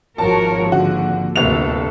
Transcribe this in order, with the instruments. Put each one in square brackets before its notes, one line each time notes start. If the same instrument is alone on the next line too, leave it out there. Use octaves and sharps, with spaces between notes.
[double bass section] G#1 F3 [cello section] F#4 A#4 C#5 [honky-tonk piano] A5
[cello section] D3 A#3 [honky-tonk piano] F#4
[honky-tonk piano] G1 F7 [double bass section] D2 C3 A#3 [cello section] A4